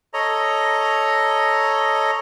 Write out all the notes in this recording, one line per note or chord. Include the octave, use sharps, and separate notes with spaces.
A4 C#5 D#5 A#5